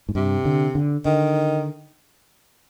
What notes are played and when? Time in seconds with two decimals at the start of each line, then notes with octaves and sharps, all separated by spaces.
0.09 G#2
0.15 G2 C3
0.45 D3
0.75 D3
1.05 D3 D#3